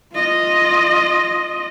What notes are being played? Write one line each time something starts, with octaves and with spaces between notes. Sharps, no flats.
F4 D#5